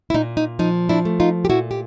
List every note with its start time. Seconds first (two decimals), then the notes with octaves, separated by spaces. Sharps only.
0.10 E4
0.14 A#2 D#4
0.37 D#4
0.59 F3 D#4
0.89 D4 E4
1.05 A3
1.20 D#4 F4
1.45 G4
1.49 A#2 E4 F#4
1.71 G4